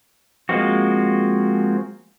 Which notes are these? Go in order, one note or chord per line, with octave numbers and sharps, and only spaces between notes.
F3 G#3 A#3 C4 F#4